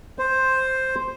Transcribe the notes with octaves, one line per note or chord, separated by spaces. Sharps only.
C5